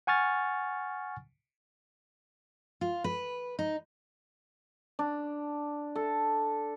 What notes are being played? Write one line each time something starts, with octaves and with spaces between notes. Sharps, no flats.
F#5 G#5 C#6 F6 A6
F4
B4
D#4
D4
A4